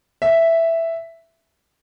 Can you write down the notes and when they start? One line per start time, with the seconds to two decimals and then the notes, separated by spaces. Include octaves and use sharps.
0.22 E5